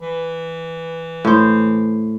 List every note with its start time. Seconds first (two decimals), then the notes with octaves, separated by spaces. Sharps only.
0.01 E3
1.25 A2 C5